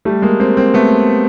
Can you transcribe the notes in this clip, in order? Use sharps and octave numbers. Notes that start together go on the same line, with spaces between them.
G3 A3
G#3 A#3
A#3 C4
A#3 C4
A3 B3